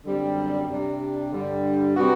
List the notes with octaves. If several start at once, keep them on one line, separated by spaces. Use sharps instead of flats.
F#2 D3 G3 C4
C3 G3 D4
G2 D3 G3
C3 G3 B3 F#4